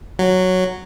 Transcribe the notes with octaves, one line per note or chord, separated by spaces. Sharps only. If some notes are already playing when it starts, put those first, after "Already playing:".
F#3